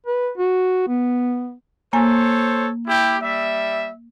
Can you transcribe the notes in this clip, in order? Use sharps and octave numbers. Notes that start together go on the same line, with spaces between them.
B4
F#4
B3
A#3 A4 C5 C#5 G#5
E4 G4
G3 E5